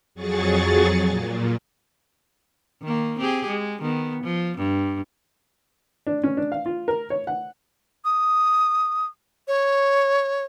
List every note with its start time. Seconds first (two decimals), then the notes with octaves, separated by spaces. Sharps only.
0.15 F2 F#3 G#4 C#6 A6
1.07 A#2
2.82 D#3 A#3
3.19 C4 G4 G#4
3.47 G#3
3.81 D#3 B3
4.23 F3
4.58 G2
6.07 D4
6.24 C#4
6.37 D4
6.52 F5
6.66 F4
6.88 A#4
7.10 C#5
7.27 F#5
8.05 D#6
9.48 C#5